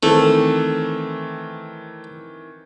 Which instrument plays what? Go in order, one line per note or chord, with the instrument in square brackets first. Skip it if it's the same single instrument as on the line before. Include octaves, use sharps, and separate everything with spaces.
[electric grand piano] D#3 E3 C4 [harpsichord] A3